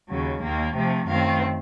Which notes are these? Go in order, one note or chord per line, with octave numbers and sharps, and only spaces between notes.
D#2 C#3 F#3
D#2 D#3 A#3
C3 F3 A3
F#2 D#3 A3 C4 F5